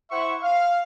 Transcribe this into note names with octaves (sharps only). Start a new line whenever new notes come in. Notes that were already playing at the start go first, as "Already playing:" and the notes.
E4 C5 E5 F#5 C#6
F5